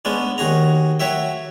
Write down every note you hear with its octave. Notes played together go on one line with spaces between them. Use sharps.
G#3 B3 C#4 D4
D#2 F#4 G#4 A#5
F#3 F#4 C#5 E5 G5